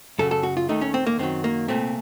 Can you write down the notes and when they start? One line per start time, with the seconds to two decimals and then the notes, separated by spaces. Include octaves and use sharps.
0.19 F#2 C#3 F#3 A4
0.31 A4
0.43 F#4
0.57 F4
0.69 D#2 D#3 A3 D#4
0.81 C#4
0.94 C4
1.07 A#3
1.18 F#2 D#3 F#3 C4
1.44 A#3
1.68 C2 A#2 A3 C4